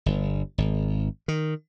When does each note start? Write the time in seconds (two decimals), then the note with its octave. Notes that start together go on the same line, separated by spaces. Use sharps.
0.06 G1
0.58 G#1
1.28 D#3